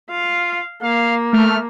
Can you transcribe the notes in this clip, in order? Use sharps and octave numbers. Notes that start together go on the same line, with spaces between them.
F4 F5
A#3 F5
A3 F6